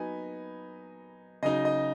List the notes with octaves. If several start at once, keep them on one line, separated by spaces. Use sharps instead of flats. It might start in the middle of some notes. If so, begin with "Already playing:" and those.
Already playing: F#3 B3 D#4 G#5 B5
C#3 F#3 D#4 D#5
D#5